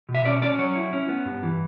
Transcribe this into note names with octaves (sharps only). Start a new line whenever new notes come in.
B2
E5
C#4 D5
C#4 D5
F#3 C#5
E4
C#4
B3
G2
E3